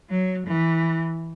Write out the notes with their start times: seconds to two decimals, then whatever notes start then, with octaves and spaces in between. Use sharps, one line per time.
0.10 F#3
0.47 E3